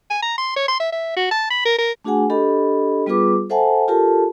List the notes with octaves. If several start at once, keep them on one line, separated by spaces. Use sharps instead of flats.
G#5
A#5
C6
C#5
C6
E5
E5
F#4
A5
B5
A#4
A#4
A3 D4 F#4 G#4 F#5 G#5
D4 G4 A4 D#5 B5
G3 B3 F4 G#4 B4 D6
A4 C5 E5 F#5 G#5 A5
F4 G4 A4 A#4 A5